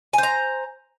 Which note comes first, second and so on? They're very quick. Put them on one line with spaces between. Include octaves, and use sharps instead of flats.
G#5 C5 A#5